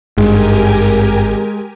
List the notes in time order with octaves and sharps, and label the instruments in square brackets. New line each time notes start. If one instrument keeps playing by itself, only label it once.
[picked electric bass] G#1 [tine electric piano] G2 [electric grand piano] G#3 [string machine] G4 A#4 G#5